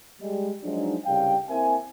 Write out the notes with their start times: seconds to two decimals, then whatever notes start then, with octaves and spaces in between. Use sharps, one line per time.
0.20 G3 G#3
0.63 F3 F#3 G#3 D4 D#4
1.05 C2 C#3 G3 F5 G5
1.49 A#3 C4 E4 A#4 E5 G#5